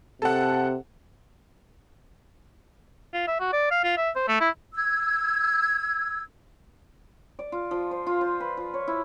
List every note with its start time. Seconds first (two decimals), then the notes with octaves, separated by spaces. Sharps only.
0.22 C3 A4 F#5
3.14 F4
3.28 E5
3.40 F#4
3.53 D5
3.71 F5
3.84 F4
3.98 E5
4.16 C5
4.28 A3
4.41 E4
4.75 E6 G#6
7.39 D5
7.52 F4
7.71 F3
7.91 C5
8.06 F4
8.21 C5
8.40 B4
8.57 F3
8.74 C#5
8.88 E4